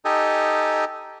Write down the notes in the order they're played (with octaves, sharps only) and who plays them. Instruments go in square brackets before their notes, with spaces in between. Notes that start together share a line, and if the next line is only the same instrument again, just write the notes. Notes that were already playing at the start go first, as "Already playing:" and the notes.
[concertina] D#4 G4 A4 D#5 G#5